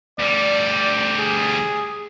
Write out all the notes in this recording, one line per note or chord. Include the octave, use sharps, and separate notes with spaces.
D2 G3 D5
G#4